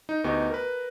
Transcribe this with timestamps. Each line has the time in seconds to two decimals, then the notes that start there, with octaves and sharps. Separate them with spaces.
0.09 D#4
0.24 D2 B3 D#4 G4 D#5 C#6
0.50 A#4 B4